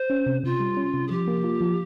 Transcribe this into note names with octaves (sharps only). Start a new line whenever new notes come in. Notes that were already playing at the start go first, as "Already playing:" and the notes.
Already playing: C5
C#4
C3
C3 F4
G3
C#4
C3
G#4
F3 G4
A#3
F4
F3